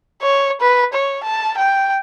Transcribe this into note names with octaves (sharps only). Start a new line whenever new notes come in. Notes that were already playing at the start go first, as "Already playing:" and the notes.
C#5
B4
C#5
A5
G5